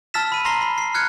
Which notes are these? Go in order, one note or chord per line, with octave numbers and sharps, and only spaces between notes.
A5 E6 F6 A6 B6 E7
B5 D#7
A#5 C6 A#6 C7 G7
B5
C7
F6 F#6 G#6 C#7